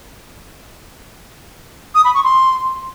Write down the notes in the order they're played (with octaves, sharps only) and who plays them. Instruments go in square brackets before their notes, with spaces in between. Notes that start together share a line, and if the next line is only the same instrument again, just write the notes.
[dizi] D#6
B5
C#6
C6